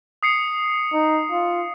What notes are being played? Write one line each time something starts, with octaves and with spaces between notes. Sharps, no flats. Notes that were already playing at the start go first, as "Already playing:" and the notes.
D#6 C7 C#7
D#4
F4